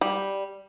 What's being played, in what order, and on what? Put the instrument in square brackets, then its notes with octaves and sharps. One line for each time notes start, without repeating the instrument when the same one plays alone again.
[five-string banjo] G3